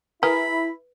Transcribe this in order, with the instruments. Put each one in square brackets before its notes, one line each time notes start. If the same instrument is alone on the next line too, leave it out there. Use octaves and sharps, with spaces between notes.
[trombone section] E4 [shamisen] G#4 A#4 [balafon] B4 [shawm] B5